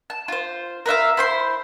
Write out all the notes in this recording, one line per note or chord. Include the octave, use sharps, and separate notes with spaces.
A5
F4 C5
A#4 B4 E5 F5
E4 C5 C6